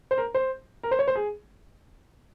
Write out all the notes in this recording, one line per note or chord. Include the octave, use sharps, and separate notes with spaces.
C5
A#4
C5
A#4
C5
C#5
C5
G#4